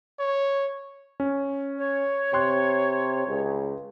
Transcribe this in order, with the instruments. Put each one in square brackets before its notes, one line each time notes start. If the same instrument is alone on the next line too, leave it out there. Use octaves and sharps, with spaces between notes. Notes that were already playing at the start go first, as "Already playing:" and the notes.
[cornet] C#5
[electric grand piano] C#4
[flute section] C#5
[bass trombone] C3 [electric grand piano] G5 C6 F#6
[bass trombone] C#2